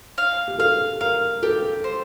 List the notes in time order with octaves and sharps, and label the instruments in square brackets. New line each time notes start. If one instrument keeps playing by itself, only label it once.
[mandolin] F5
[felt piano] G4
[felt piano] A4 [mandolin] F5
[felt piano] A#4 [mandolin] F5
[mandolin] G4 [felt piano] A4
[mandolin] C5